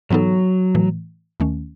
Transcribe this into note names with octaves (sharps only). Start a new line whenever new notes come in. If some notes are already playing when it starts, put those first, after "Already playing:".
G#2 E3 F#3 B3 D#4 A4
A2 E3 A3
D#2 D#3 A3 C#4